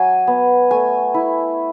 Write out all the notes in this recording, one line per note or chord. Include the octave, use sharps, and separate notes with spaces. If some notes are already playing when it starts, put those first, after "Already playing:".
Already playing: F#3 G#5
B3
A3 G#5
E4